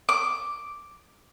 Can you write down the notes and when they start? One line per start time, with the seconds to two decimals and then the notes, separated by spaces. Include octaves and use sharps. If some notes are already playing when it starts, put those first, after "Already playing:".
0.09 D6